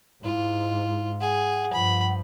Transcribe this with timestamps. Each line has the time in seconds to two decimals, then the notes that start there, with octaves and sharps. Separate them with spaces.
0.24 G#2 E4 F4
1.20 G#4 F#5
1.73 G2 F3 B5